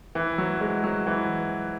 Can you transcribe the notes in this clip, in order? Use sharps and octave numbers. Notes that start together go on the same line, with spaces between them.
E3
F#3
G#3
F#3
E3